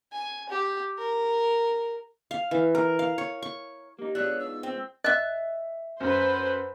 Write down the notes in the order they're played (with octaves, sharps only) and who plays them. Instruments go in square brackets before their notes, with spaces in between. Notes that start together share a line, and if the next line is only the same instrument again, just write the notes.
[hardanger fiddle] G#5
G4
A#4
[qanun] F5
E3
A#4
F5
C#5
C#6
[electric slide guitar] A#3 D#4 [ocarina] G4
[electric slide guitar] G#3 B3 F4 [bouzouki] D4 C#5 E5 [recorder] F#6
[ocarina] D#4 [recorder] E6
[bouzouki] C4
[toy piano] D#5 [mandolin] E5 F#6
[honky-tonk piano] F#2 [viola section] B4 C5